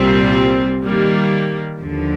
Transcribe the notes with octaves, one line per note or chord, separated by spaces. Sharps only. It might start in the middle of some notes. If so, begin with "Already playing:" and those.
Already playing: C2 A#2 G3 C4
D#3 G3 A#3
D#2 D3 F3